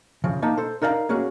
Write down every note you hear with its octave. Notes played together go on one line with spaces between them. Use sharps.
C#3 F3
A#3 D#4 A5
A4 C5
D#4 A#4 D5 F5 G5 A#5
A#3 C#4 F#4 G#4